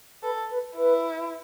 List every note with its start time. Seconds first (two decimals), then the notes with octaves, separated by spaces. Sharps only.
0.22 A4 B4
0.50 B4
0.77 E4 B4